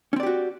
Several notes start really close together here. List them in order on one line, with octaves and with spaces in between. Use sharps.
C#4 C4 D5 G4 F#4